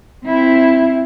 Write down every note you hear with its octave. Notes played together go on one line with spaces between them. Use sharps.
C4 E4